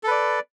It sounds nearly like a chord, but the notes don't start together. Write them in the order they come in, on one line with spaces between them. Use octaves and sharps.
A4 B4 D5